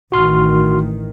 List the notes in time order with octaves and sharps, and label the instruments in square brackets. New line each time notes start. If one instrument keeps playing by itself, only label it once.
[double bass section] A1 D#3 [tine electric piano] F#4 C6 F6